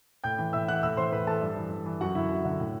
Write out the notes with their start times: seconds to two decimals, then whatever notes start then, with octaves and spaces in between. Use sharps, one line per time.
0.24 A2 G5 G6
0.38 E3
0.53 A2 E5 E6
0.68 E3 F#5 F#6
0.83 A2 E5 E6
0.97 E3 C5 C6
1.12 A2 B4 B5
1.27 E3 A4 A5
1.42 G2
1.57 E3
1.71 G2
1.86 E3
2.01 F#2 F#4 F#5
2.15 D3 E4 E5
2.29 F#2
2.45 D3
2.60 A2